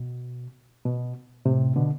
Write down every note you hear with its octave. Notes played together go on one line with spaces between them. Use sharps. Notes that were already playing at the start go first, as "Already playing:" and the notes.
Already playing: B2
B2
A2 C3
B2 D3